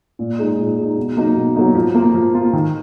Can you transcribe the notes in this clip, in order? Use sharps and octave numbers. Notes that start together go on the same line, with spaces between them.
A#2
G#3 D#4
A#2
G#3 D#4
B2
F#3 A#3 D#4
B2
F#3 A#3 D#4
F3
A#3 F4
F3
A#3 F4
D#3